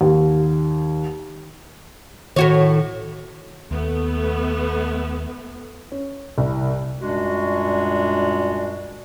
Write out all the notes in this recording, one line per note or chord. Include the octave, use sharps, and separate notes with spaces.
D#2
A2 D#3 F#4 C#5
D#2 A3 B3
C#4
C2
F#2 A#2 G3 G#3 D4 F#4